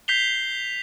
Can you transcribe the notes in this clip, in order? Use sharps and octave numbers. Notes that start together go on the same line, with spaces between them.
G6 B6 C7 F7 G7